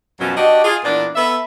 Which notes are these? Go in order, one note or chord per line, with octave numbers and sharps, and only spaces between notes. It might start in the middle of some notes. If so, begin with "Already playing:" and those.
F#2 B2 F3 F#3 C#4
D4 F#4 G4 D#5
F4 G#4
A#2 E3 B3 D4
B3 A4 E5